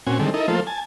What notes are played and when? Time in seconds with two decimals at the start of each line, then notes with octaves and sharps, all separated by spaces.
0.07 A#2 C4 C#4 F#4 G#5
0.19 D3 D#3 G3 G#3 C4 A4
0.34 D#4 E4 A4 A#4 D#5
0.48 F3 A3 A#3 F4 A4 C5
0.67 G#5 A5